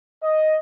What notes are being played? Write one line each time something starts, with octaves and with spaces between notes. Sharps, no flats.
D#5